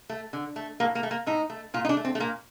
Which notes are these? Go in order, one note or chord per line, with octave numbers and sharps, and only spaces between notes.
A3
D3
A3
A2 A#3
A#3
A3
A#3
A2 D#4
A3
A#2 F4
D#4
D4
A3
C4
A3
A#2 A#3